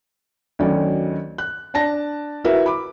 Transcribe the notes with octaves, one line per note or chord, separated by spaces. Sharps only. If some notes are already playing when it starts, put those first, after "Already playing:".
D2 D#3 F#3 C#4 D5
F#6
D4 D5 A5 A#6
E4 F#4 A#4 B4 E5
B5 D6